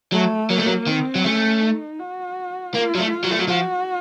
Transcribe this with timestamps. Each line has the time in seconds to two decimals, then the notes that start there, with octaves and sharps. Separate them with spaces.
0.12 F#3 A3
0.49 F#3 A#3
0.58 A3
0.66 F#3
0.87 D#3 C4
1.15 F#3
1.25 A3 C#4
1.61 D#4
1.99 F#4
2.74 A#3 F4
2.95 F#3
2.99 A3
3.10 F4
3.24 F#3
3.31 A3
3.39 F#3
3.48 F3 F#4